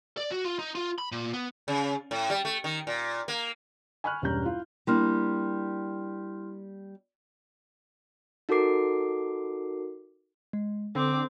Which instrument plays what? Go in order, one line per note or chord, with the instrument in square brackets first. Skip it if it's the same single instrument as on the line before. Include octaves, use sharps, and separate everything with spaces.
[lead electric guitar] D5
F#4
F4
D#4
F4
B5
A#2
B3
[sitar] C#3
A2
G3
A3
D#3
A#2
A#3
[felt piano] G#5 B5 C#6 F6 F#6
E1 G2 G3 C#4 A#5 G6
E4 F4
[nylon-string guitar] G3 A#3 D4 [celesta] E4 C6 F6
[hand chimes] D#4 F#4 A4 A#4 D6 C7
[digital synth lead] G#3
[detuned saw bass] D3 [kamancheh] C4 D6 [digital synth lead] A4